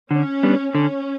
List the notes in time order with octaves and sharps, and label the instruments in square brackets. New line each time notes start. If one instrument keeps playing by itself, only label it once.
[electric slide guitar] D3 [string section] C#4
[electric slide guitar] G3 B3 D4
[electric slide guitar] D3 [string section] C#4